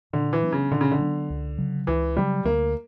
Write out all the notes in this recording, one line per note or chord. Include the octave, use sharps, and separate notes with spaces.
A#2 D3
E3
F#3 B3 D4
C#3
A#2 D3
C#3
D3
F#3 B3 D4
C#2
C#3 F#3
C#2 E3
C#3 F#3 G3
D2 A#3